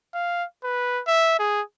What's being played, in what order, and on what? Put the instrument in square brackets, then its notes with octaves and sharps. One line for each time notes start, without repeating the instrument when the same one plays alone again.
[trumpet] F5
B4
E5
G#4